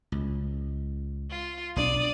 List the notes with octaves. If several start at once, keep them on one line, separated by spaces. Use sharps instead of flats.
C#2
F4
B1 F#3 D4 D5 D#6